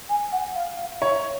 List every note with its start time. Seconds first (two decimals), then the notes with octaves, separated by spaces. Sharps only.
0.09 G#5
0.32 F#5
0.55 F5
0.78 F5
0.94 F5
1.02 C#5 E5